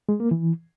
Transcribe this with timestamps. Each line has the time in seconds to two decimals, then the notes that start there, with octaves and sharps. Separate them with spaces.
0.09 G#3
0.20 A#3
0.31 E3